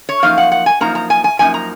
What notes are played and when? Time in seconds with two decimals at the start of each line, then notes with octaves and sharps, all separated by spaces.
0.09 C#5
0.22 F#2 F3 A#3 D#4 F5
0.38 F#5
0.52 F#5
0.66 G#5
0.81 F#2 F3 A#3 D#4 A#5
0.95 A#5
1.10 G#5
1.24 G#5
1.39 F#2 F3 A#3 D#4 G#5
1.54 A#5